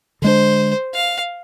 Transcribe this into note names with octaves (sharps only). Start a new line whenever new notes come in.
D3 G#3 D4 C5
F5